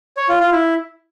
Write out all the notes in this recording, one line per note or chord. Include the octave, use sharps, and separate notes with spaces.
C#5
F4
F4
E4